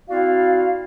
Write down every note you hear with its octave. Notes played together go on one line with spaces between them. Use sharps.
C4 E4 F#4 D5 F5